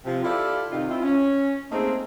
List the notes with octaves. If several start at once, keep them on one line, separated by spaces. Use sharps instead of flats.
C3 F3 F4
E4 F4 G4 A4 D5 F5
C3 D#3 F4
C4 E4 F4
C#4
A3 A#3 C4 D#4 G#4